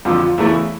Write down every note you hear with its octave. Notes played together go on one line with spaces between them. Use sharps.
F2 D3 F3 F4
F4
E2 C#3 E3 A3 E4